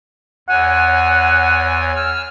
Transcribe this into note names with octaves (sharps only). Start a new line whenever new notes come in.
E2 C#5 F#5 G#5
E6 F6